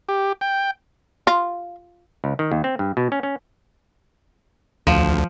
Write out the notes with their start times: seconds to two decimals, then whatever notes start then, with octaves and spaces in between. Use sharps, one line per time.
0.09 G4
0.41 G5
1.27 F4
2.24 C#2
2.39 D#3
2.52 D#2
2.64 C4
2.79 G2
2.97 B2
3.12 C#4
3.23 C#4
4.87 D2 F3